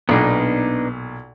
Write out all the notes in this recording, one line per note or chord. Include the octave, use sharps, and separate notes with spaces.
B1 A#2 B3 D4 D#4